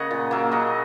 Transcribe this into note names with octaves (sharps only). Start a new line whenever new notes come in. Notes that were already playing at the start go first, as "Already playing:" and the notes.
Already playing: C#3 A#3 C#5 D#5 F#5
A#2
F#3 A#3
C#3 D#5 F#5